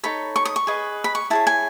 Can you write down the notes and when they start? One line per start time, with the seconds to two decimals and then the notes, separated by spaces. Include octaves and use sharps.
0.03 D#4 A4 C#5 B5
0.36 C#6
0.45 D#6
0.56 C#6
0.67 G#4 B4 D#5
1.04 B5
1.15 C#6
1.30 E4 G#4 C#5 A5
1.47 G#5